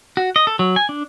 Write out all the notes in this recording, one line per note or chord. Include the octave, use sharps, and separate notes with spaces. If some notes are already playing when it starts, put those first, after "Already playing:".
F#4
D#5
A4
F#3
G#5
D4